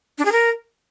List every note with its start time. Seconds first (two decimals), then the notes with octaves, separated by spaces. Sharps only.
0.18 D4
0.25 G#4
0.32 A#4